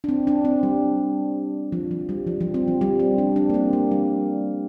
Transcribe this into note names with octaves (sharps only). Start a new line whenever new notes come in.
D4
C4
D4
C4
G3
F3
F3
G3
F3
F3
C4
F3
G3
C4
D4
D4
A#3
C4
A#3
G3